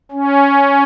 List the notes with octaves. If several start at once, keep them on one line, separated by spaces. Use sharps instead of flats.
C#4